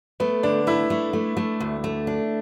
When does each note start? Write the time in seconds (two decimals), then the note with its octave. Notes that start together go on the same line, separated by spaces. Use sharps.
0.20 A3 B3
0.43 D3 D4
0.67 A3 E4
0.90 A3
1.13 A3
1.37 A3
1.60 D2
1.84 A3
2.07 D4